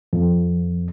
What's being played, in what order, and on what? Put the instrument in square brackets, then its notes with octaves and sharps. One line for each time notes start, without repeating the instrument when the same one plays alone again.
[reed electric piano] F2